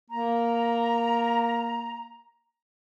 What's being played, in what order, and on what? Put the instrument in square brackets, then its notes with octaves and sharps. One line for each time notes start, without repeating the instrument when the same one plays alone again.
[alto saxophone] A#3 [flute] A#5